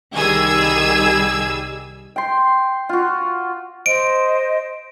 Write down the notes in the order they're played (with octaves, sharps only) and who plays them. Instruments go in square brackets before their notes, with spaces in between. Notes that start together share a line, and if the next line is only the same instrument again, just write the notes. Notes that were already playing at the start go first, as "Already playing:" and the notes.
[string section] C2 D#3 G3 G#4 E6 G#6
[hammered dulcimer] G5 C6
F4 F#4
[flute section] C5 D#5 [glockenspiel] D7